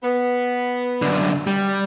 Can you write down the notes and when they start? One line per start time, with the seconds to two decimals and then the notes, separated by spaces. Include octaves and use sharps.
0.03 B3
1.02 F#2 D3
1.47 G3